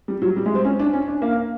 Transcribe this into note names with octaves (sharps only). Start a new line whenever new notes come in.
G3
F#3
G3
G#3
C4
C#4
D4
C#4
D4
A#3